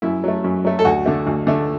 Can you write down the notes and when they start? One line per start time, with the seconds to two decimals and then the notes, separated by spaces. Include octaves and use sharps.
0.02 F#2 E4
0.24 F#3 A3
0.44 F#2
0.65 F#3 A3
0.79 A4
0.85 D2 F#4
1.06 D3 A3
1.27 D2
1.47 D3 A3